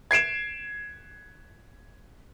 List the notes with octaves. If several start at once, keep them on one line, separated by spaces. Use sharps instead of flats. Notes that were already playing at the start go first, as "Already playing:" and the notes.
G#6 C7 D7 E7